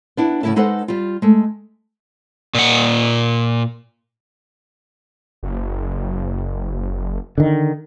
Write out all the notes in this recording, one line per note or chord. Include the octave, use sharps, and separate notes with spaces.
B3 D4 E4
A2 C#3 B3 E4 E5 A5
G#3 D#4 A4 B4 C5 F#5
G3 F4
G#3 A3
A#2 F#5
F#1
D3 D#3